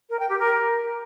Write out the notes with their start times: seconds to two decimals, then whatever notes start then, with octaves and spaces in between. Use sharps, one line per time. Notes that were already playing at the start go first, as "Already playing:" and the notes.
0.10 A#4
0.19 G5
0.29 G4
0.39 A#4